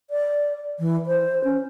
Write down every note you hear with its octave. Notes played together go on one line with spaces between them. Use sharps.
D5
E3
C5
C#4